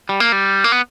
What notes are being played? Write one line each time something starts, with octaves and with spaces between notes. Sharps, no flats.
G3
A#3
G3
A#3
B3